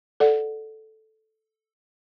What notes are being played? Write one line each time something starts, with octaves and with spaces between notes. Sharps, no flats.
A4 D5 F#5